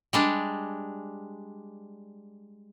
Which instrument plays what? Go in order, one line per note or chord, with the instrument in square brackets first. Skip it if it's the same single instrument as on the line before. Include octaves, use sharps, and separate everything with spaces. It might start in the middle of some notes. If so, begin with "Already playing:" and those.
[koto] G3 G#3 D4